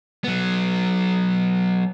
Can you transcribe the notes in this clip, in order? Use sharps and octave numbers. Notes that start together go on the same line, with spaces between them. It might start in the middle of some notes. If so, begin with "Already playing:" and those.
F#3 B3